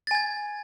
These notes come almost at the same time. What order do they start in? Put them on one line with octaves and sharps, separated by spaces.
A6 G#5 G#6